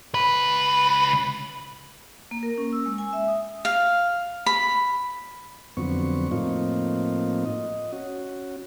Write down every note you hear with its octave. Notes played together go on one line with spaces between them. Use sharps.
C#2 B4
A#3
A#4
C#4
E6
G#3
G#5
E5
D#6
F5
B5
F2 D3 F#3 B3 C4 C#6
A2 F3 A#3 C4 D#4 F4
D#5
C#4 F#4